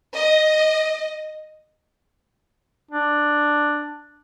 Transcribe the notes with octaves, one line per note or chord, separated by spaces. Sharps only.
D#5
D4